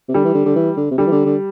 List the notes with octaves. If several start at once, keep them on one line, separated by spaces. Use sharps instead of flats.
C3
D3 G3
E3
D3
D3
E3
D3
C3
D3 G3
E3
D3
D3